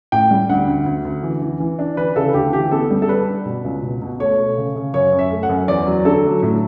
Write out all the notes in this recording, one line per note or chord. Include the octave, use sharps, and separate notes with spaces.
A2 G5
G3
D2 F#5
D2
D2
D2
E3
E3
E3
D4
E3 B4
C#3 A4
D2 G4
E3 G4
B3 A4
G3
A4
G3 B4
D4
B2
C#2
B2
B2
A3 C#5
A3
C#3
C#3
F#2 C#5
F#2
E5
A3
F#5
F#2
E2 D5
F#3
D3 A4
F#3
A2